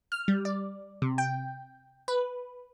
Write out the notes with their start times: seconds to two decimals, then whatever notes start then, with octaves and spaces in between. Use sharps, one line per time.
0.12 F6
0.28 G3
0.45 D5
1.02 C3
1.18 G5
2.08 B4